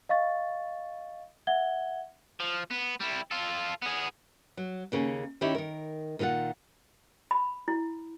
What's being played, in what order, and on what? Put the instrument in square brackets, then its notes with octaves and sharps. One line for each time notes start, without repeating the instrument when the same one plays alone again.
[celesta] D#5 F5 C#6 A6
E5 F#5 G#6 G7
[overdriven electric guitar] F3
B3
G3 E4
F4 A4
B3 G#4
[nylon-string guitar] F#3
D#2 C#3 A#3 C#4
D#3 C#4 D#4 E4 G4
D#3 A#4
A#2 D#3 F4 A#4 F#5
[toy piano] B5
E4